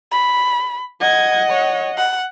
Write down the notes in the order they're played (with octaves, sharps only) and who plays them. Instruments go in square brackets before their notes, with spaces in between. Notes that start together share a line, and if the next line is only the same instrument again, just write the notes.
[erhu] B5
[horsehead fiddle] D#5 F#5 [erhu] G#6
[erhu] C#5
F#5